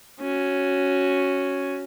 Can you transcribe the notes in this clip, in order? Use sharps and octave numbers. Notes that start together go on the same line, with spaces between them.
C#4 F#4